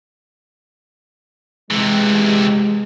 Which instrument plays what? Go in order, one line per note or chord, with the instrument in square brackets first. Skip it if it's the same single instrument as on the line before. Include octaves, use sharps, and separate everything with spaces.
[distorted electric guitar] C3 E3 [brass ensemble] G#3